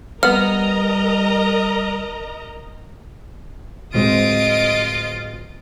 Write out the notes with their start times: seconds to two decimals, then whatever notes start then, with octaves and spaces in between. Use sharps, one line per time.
0.23 G3 B3 A#4 D#5 F#5 A#5 F6
3.94 D1 G#3 C4 F4 D#5 D7